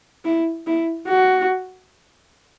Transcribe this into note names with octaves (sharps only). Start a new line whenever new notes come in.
E4
E4
F#4